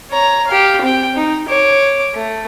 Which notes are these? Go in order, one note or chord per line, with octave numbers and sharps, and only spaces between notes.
C#5 A#5
G4 F5
C4 G5
D#4
C#5 D6
A3